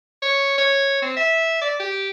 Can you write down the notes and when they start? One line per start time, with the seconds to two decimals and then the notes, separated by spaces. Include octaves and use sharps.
0.23 C#5
0.58 C#5
1.02 C4
1.17 E5
1.61 D5
1.80 G4